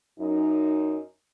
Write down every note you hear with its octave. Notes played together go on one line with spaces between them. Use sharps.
F#2 D#4